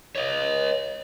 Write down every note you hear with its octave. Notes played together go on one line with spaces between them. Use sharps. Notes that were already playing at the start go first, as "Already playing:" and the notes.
C#5 D#5